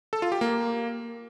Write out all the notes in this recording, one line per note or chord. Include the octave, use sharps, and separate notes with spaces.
A4
F4
G4
A#3